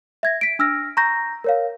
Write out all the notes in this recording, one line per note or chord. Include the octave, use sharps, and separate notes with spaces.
E5 G#6 A#6
B6 D7
D4 E6 F6 A#6
A#5 C#6 G6 A#6
A#4 C#5 F5